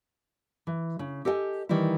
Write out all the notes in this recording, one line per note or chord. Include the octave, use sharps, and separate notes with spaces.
E3
C#3
G4 A4 D#5 G5 G#5
D#3 E3 G3 D#4 E4